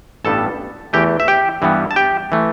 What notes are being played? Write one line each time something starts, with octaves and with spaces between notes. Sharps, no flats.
A1 G2 G3 B3 A4 A5
E2 E3 A3 G4 G5
E5
G4 G5
G2 E3 G3 B3
A5
G4 G5
E3 A3